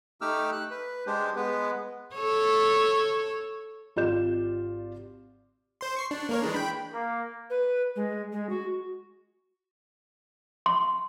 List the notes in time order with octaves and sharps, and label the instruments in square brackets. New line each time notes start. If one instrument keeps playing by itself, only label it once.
[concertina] A3 D#4 G4 D6 E6 F6
F#6
B4
G#3 D4 G4 C5
G#3 B3 B4
[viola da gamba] A4 C#5
[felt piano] G#1 F4 G4 D5 G6 E7
[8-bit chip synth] C5 C6
C#6 C7
D4
A#3 A#4 C#5
E3 G#3 D4
G5 B5
[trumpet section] A#3
[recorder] B4
G#3
G#3
F#4
[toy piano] C6